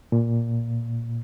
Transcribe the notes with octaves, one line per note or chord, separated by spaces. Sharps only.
A#2